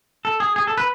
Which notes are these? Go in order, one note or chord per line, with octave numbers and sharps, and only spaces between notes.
A4
G#4
G#4
A4
B4